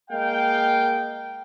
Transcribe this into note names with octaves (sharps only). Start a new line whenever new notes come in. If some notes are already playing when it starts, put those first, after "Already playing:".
G#3 A#3 F5 G5